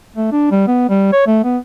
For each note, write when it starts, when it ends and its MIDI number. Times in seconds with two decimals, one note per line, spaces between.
0.15 0.30 57
0.32 0.49 62
0.51 0.65 55
0.67 0.87 59
0.89 1.10 55
1.13 1.22 73
1.27 1.41 57
1.44 1.58 59